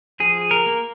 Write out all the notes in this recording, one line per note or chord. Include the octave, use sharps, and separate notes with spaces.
F3 G#4
A#4
A#3